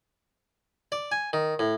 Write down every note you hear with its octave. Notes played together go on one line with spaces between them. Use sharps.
D5
G#5
D#3
A2